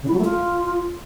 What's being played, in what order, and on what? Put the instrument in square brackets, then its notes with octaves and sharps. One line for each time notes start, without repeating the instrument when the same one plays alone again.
[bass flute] C#3
E4
F#3
A3
F4